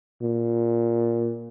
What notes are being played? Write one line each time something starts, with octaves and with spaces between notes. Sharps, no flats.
A#2